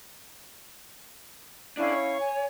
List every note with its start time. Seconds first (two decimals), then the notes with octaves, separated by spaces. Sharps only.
1.77 D3 C#4 D4 E4 F5
1.93 C#5
2.18 G#5